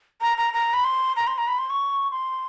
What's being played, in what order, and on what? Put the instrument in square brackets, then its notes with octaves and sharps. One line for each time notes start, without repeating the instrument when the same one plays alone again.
[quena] A#5
A#5
A#5
B5
C6
A#5
C6
A#5
B5
C6
C#6
C6